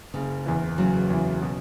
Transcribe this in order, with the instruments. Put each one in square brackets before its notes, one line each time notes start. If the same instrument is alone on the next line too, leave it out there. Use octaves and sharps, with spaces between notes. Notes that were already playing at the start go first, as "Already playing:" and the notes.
[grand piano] F#1 [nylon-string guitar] C#3
[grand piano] E2 E3
[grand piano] F#1 [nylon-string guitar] C#3 F#3
[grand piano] E2 E3
B2